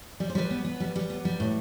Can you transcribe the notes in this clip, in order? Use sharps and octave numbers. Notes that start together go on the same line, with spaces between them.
G3 D5
C5
G3 B4 D5
B3
B3
G3
G3
B3
G3
A2